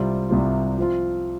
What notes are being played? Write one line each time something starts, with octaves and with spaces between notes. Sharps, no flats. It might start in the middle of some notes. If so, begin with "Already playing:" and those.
Already playing: C2 C3 G3 C4 F4
C2 C3 G3 C4 F4
F3 C4 F4